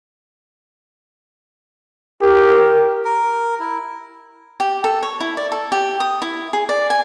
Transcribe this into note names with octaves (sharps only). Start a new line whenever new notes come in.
G4 A#4
A#4
E4
G4
A4
C#5
E4
D5
A4
G4
D#6
E4
G#4
D5
G#5